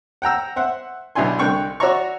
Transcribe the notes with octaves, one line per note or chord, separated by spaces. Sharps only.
F#5 G5 A#5 E6
C5 E5 F#5
B1 B2 D4 E4 G#5 C6
C2 D3 G5 C#6 F#6
F#4 C#5 D5 E5 A#5 C#6